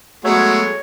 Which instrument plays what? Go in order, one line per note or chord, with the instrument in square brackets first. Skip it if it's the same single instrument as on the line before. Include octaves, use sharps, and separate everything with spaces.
[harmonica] F#3 G#3 B3 [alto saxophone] A3 [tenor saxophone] F#4 [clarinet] C#5